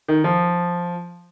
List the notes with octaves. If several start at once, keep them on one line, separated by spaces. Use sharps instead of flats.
D#3
F3